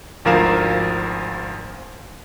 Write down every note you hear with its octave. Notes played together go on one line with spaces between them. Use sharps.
G#1 D2 F3 A#4 F5 E7